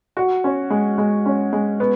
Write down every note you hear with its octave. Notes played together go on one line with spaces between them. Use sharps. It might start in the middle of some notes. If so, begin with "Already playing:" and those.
F#4
C#4
G#3
G#3
C#4
G#3
B3